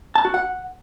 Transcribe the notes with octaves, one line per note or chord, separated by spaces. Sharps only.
A5
F#4
F#5